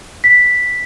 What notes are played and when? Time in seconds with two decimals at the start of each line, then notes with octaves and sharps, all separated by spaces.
0.24 B6